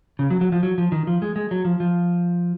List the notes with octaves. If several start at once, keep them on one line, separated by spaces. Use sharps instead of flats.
C#3
F#3
F#3
F3
F#3
F3
D#3
F3
G#3
G#3
F#3
F3
F3